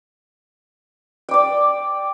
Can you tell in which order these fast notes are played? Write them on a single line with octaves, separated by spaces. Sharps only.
G5 D6 D5